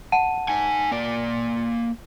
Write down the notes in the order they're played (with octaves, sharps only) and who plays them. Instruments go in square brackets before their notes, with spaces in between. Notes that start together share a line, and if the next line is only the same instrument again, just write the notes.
[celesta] F#5 A5 D#7
[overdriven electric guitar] D#4 G#5
A#3 D5